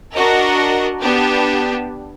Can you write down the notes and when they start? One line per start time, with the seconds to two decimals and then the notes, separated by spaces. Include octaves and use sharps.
0.15 D4 F#4 A#4 D#5
1.02 B3 D4 G4